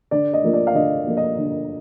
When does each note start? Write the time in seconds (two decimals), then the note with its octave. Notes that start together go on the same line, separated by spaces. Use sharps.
0.11 D3 D5
0.33 D#5
0.44 F3 A#3 F4
0.54 D5
0.67 F5
0.75 D3 D#5
1.07 F3 A#3 F4
1.17 D#5
1.38 D3